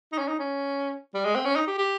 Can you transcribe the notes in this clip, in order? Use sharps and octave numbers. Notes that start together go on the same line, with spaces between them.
D#4
C#4
D#4
C#4
G3
G#3
C4
C#4
D#4
G4
G4